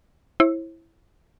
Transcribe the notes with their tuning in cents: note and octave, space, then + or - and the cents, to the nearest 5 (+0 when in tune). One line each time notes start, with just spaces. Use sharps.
E4 +0 C5 +45